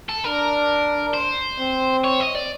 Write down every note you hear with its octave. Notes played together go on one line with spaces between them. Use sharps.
A4
D4 A#4
C5
C4
C#5
D#5
D5